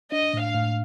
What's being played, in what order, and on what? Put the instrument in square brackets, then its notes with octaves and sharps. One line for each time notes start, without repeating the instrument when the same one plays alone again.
[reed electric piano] D4 [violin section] D#5
[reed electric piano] A2
[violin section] F5
[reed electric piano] A2